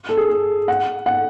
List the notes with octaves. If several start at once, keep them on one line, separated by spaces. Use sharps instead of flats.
A4
G#4
A4
F#5
F#5